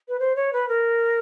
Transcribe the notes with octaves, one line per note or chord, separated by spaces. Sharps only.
B4
C5
C#5
B4
A#4